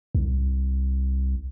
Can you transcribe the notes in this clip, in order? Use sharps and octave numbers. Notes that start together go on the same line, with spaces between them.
C2